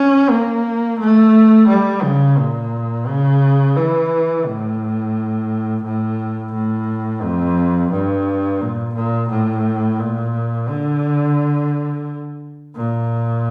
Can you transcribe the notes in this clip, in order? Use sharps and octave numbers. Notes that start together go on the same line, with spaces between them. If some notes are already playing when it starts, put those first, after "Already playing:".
Already playing: C#4
A#3
A3
G3
C#3
A#2
C#3
E3
A2
A2
A2
F2
G2
A#2
A#2
A2
A#2
D3
A#2